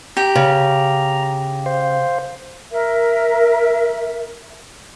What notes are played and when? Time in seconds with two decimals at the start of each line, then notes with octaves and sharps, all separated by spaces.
0.17 G4 A#5
0.35 C#3
1.66 C5 F5
2.71 A#4 E5